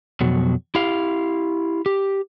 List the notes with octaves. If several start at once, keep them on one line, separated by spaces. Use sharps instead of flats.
F2 B2 F#3
E4 G4 F5
G4